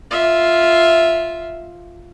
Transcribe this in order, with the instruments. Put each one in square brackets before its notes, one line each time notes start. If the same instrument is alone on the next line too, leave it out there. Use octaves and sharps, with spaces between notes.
[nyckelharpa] F4 E5